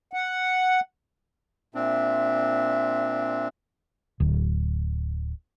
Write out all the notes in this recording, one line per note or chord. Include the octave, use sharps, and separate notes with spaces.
F#5
A#2 C4 D4 E5
D1